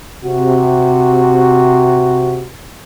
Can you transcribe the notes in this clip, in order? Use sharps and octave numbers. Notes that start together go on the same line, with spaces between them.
C3 F#4